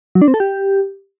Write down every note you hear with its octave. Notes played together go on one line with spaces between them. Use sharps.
F#3
D4
C4
A4
G4